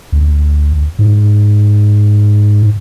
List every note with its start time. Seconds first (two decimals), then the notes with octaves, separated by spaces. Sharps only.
0.12 D2
0.99 G#2